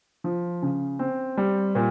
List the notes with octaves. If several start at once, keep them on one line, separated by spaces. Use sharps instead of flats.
F3
C#3
C4
G3
A#2